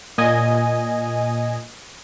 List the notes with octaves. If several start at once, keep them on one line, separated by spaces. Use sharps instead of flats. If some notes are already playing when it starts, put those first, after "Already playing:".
A#2 D#5 G#5